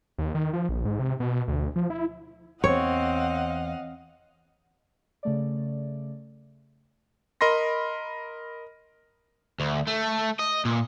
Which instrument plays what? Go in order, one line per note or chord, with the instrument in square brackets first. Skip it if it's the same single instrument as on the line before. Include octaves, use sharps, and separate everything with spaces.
[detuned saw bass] D#2
D#3
F3
A#1
G#2
C3
B2
D2
F3
E4
[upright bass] E2 [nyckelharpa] C4 [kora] C#5 [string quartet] D#5 F5 F#5
[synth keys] C#3 A3 D5
[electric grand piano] A#4 D#5 B5 C6 A#6
[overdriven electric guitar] D2
A3
D#5
A#2